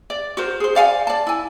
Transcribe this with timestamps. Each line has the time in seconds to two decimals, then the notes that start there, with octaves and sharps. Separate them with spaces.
0.10 D5
0.37 F#4 A#4 C5
0.60 G#4 C5
0.75 D5 F5 F#5 G#5
1.07 D5 A5
1.27 E4 G#5